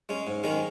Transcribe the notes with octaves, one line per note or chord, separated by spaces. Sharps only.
G#3 C#4
G#2
D#3 G#3 C#4 A#4